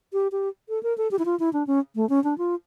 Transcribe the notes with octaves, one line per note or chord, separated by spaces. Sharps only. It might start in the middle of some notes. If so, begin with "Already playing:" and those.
G4
G4
A4
A#4
A4
G4
E4
F4
E4
D4
C#4
A3
C#4
D4
F4